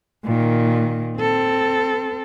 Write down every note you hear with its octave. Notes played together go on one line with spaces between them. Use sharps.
A#2 D#3
C4 A4